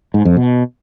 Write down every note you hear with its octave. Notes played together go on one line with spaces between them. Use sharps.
G#2
F2
B2